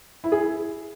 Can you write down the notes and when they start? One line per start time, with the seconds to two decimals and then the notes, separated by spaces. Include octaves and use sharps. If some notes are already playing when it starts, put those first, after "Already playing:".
0.24 E4
0.32 G#4
0.40 E4